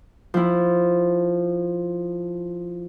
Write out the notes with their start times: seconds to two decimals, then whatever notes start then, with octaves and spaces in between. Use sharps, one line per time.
0.34 F3 E4